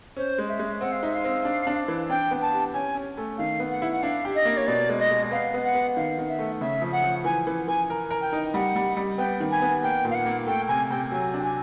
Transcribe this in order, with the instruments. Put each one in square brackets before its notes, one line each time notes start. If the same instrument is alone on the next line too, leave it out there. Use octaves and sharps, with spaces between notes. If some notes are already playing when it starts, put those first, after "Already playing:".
[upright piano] C#4 [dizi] C5
[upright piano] G#3
[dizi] E5
[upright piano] G#3
[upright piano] C4 [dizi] F#5
[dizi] F5
[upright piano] D#4 [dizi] E5
[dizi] F5
[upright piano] C4
D4
D4
E3
[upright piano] D4 [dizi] G5
[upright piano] B3
[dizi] A5
[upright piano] G4
[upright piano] C#4 [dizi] G#5
[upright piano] C#4
A3
[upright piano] D#3 [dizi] F5
[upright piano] B3
[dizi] F#5
[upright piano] E4
[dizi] F#5
[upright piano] D4 [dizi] F5
[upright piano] G4
[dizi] D#5
[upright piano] A#3
[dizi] C#5
[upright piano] B2 [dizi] D5
[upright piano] G#3
[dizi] D#5
[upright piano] G#3
[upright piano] B3 [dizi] F5
[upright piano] B3
[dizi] F#5
[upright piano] B3
[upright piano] D#3 [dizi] F5
[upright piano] D#3
[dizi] E5
[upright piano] A3
[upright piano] C#3 [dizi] E5
[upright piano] F3
[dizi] F#5
[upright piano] F3
[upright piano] E3 [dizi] G#5
[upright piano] E3
[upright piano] E3 [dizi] G#5
[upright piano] A#4
A#4
[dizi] G5
[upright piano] D#4
[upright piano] G3 [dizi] F#5
[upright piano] G3
G3
[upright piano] B3 [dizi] G5
[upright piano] D#3
[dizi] G#5
[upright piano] B3
[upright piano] A#3 [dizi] G5
[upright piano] A#2
[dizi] F5
F#5
[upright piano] A#3
[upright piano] A3 [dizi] G5
[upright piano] C3 [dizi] G#5
[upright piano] C3 [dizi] G5
[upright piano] F#3 [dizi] G#5
[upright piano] D4
[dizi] G5
G#5